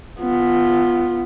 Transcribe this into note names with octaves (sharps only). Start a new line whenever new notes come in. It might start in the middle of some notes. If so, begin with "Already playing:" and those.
B3 F4